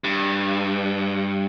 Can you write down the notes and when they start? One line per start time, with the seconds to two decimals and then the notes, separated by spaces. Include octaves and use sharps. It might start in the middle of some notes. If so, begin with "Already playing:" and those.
0.04 G2